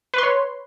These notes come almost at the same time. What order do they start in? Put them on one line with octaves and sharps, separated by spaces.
B4 C6 C#5